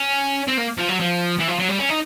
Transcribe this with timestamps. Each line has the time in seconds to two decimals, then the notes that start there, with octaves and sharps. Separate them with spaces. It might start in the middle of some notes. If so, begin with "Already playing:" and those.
Already playing: C#4
0.47 C4
0.57 A#3
0.78 F3
0.89 F#3
1.00 F3
1.39 E3
1.48 F3
1.59 F#3
1.69 G3
1.79 C#4
1.89 D#4